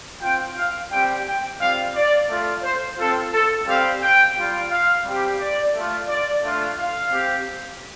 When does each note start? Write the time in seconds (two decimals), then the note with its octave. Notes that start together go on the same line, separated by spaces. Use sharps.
0.21 C4 F4 G5
0.56 F5
0.91 G3 C4 G4 G5
1.25 G5
1.60 G3 C4 F4 F5
1.95 D5
2.28 A3 F4
2.63 C5
2.97 C4 F4 A4
3.32 A4
3.66 G3 C4 G4 F5
4.01 G5
4.36 G3 F4
4.70 F5
5.04 G3 C4 G4
5.39 D5
5.73 A3 F4
6.08 D5
6.43 A3 D4 F4
6.77 F5
7.12 C4 G4